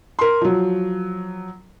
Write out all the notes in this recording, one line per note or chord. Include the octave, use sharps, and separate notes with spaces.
A#4 C6
F3 F#3